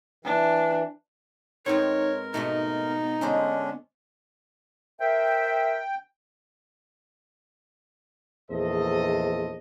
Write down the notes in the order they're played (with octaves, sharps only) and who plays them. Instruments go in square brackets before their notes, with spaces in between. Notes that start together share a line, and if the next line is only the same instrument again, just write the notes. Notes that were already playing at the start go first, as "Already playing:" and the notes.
[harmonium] E3 [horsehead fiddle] D4
[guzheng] G#2 B3 C4 [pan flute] D#4 [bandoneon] A#4 [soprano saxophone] C#5
[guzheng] G#2 B2 A3 [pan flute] B3 [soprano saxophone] D#4
[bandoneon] D3 C#4 D4 [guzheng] G#3 C5 D#5
[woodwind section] A#4 C5 E5 [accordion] G5
[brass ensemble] A#1 E2 A4 C5 D#5